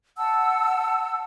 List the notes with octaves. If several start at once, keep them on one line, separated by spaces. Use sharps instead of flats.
F#5 A5 E6